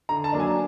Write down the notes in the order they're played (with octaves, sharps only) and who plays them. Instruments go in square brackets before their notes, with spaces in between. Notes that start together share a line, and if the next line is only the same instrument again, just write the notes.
[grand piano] D3 A#5
A5
F#3 A#3 D4
G#5